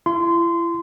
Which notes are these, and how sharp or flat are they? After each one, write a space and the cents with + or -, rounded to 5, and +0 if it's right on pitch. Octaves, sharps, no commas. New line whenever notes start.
E4 +40 C6 -20